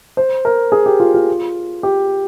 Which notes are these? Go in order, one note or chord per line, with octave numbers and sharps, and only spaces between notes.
C5
A#4
G#4
G4
F4
F4
G4